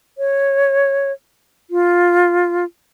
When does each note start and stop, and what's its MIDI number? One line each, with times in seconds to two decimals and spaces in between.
0.18 1.12 73
1.70 2.64 65